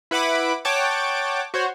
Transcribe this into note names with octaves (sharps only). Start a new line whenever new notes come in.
E4 B4 F#5 B5 D6
C#5 F#5 G5 A5 D6
F#4 C5 C#5